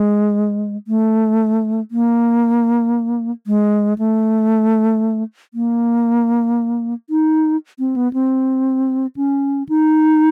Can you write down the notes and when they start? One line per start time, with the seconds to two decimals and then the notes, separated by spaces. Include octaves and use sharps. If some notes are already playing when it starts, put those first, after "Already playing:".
Already playing: G#3
0.88 A3
1.91 A#3
3.47 G#3
3.98 A3
5.54 A#3
7.10 D#4
7.79 C4
7.96 B3
8.13 C4
9.16 C#4
9.69 D#4